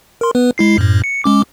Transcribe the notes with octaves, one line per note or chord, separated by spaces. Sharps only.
A#4 C6
B3 B4
G#3 E4 C7
F#2 A2
C#7
G#3 C#4 D6